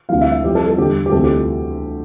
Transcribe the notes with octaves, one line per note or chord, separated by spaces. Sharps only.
D2 C3 E3 G3 F5
E5
E5
F2 E3 G3 G4
A4
A4
E2 D3 G3 G4
G4
D2 C3 E3 G3 A4
G4